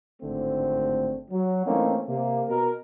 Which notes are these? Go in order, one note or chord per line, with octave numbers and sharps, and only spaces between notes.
G#1 A2 D3 A3 C4
F#3
E3 A3 A#3 C4 C#4 D#4
C3 A#3
B2 A#4